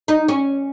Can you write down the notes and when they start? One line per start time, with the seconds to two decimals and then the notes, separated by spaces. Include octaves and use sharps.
0.08 D#4
0.28 C#4